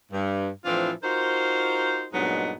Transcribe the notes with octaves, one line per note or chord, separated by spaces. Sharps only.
G2
A2 E3 F3 C4 D4 F4
D#4 F4 F#4 A#4 C5
G2 A#2 F#3 G#3 B3 D#4